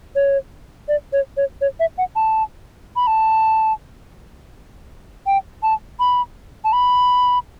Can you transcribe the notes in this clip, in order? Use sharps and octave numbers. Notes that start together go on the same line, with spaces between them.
C#5
D5
C#5
C#5
C#5
E5
F#5
A5
B5
A5
G5
A5
B5
A5
B5